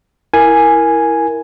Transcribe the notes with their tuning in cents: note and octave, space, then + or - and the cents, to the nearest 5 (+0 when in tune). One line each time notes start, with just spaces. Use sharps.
E4 +0 A#4 +0 G#5 +0